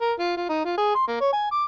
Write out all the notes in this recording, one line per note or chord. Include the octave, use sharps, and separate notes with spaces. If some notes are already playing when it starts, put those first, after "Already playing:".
A#4
F4
F4
D#4
F4
G#4
C6
A#3
C#5
G#5
D6